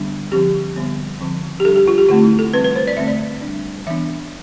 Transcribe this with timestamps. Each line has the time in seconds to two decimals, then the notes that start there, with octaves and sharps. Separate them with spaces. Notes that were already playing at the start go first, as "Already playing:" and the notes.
Already playing: D3 G3 B3 D4
0.31 D3 F3 C4 G4
0.76 D3 G3 B3
1.21 D3 F3 C4
1.60 G4
1.64 G3 D4 A4
1.76 G4
1.88 F4
1.98 G4
2.09 D3 A3 C4 F4
2.24 E4
2.39 A4
2.54 E3 G3 C4 B4
2.64 B4
2.75 C5
2.87 D5
2.97 D3 A3 C4 E5
3.08 D5
3.42 G3 D4
3.87 E3 B3 D4 E5